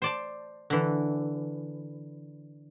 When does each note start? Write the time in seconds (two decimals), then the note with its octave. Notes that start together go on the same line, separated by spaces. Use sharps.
0.02 C5 D5 A5
0.70 D3 E3